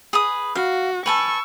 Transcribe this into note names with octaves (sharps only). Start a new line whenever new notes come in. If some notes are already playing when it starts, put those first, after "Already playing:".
G#4 B4 D#6
F#4 F5
B4 G#5 A5 C#6 E6